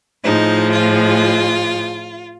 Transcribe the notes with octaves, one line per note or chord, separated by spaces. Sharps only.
A2 F3 G#3 D#4
F4